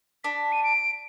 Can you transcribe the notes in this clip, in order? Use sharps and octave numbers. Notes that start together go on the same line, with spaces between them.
D4 B6
D#7
D7